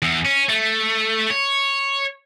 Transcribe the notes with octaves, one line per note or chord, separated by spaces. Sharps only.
E2
C#4
A3
C#5